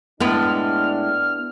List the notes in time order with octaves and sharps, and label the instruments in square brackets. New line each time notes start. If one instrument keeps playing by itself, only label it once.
[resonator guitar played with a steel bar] A2 G#3 [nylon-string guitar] B3 [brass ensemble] D4 [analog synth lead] F6